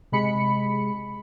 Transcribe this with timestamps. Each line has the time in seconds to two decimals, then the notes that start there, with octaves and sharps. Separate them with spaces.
0.12 C3 G#3 B5 C#7